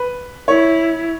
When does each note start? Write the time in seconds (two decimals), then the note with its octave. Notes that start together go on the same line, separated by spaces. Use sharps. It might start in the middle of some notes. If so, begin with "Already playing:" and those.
Already playing: B4
0.48 E4 C#5